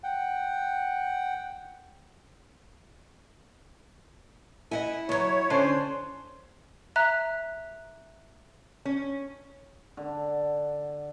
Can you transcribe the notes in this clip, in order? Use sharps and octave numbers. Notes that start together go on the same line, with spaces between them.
F#5 G5
E4 D#5 F#5 G#5
E2 F#3 C#5
D3 C#4 D4 C5 G#5
E5 A#5 F#6
C#4
D3